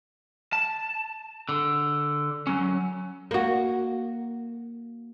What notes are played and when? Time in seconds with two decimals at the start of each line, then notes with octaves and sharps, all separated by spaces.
0.53 A5
1.49 D3
2.47 F#3 C#4
3.31 A#3 F#4